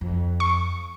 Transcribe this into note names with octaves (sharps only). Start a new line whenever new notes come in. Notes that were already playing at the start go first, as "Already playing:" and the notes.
F2
C#6